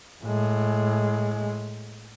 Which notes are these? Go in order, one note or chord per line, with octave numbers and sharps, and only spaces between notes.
A2 G#3